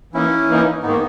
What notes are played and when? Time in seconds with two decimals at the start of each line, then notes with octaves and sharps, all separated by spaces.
0.13 E3 A#3 C#4 D#4 E4
0.48 E3 A#3 D#4
0.83 G#2 D#3 A#3 B3 D#4